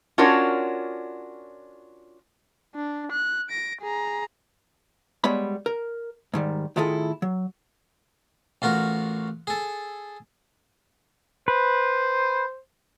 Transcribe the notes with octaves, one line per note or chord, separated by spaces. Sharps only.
C#4 D4 F4 F#4 A#4 C#5
D4
F#6
A#6 D7
G#4 A#5
G3 G#3 B3 C#5 B5
A#4
G#2 D#3 G3
A2 D#3 E4 F4 G#4 A4
F#3
A1 F4 F#4 A#4
G#4 A4
B4 C5